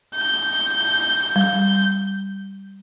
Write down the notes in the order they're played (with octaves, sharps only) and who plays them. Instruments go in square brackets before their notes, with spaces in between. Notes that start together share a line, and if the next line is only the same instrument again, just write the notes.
[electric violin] G6
[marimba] G3